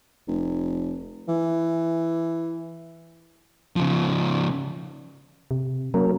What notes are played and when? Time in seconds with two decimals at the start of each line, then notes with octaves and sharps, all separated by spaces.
0.28 F1
1.29 E3
3.76 C#3 F3
5.51 C3
5.94 F#3 A#3 C#4 A#4